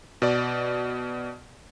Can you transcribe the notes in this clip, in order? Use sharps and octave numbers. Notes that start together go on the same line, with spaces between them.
B2 D5